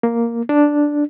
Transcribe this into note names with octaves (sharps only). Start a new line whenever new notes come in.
A#3
D4